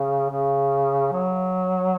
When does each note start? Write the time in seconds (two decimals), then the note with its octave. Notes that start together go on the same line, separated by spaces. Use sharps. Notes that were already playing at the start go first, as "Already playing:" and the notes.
Already playing: C#3
0.29 C#3
1.12 F#3